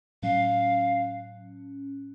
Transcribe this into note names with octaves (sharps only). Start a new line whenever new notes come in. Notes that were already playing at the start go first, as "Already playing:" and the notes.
A2 F#3 C#4 F5